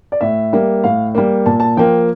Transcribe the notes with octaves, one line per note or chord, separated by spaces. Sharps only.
D5
A2 E5
G3 A#3
A2 F5
G3 A#3
A#2 A5
A5
F3 A#3 G5